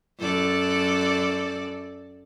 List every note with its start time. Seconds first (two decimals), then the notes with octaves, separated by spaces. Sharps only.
0.19 F#2 A4 D5